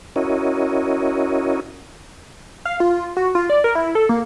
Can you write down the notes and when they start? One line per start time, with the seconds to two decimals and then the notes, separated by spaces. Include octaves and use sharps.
0.16 C#4 E4 F#4 A#4 C#5 D#5
2.65 F5
2.80 F4
3.17 F#4
3.35 F4
3.50 D5
3.64 A#4
3.75 E4
3.95 A4
4.09 A#3